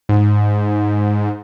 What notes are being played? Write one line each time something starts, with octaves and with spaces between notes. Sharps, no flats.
G#2